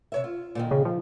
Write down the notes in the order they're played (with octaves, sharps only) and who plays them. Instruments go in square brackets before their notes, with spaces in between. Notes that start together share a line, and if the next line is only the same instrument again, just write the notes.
[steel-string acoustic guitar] C3 C#5 E5
F4
A#2 D3 D#3
[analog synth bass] C#3
F3